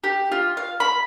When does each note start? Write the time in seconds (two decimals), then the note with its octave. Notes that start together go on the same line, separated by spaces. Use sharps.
0.04 G4
0.32 F4
0.57 F5
0.80 B5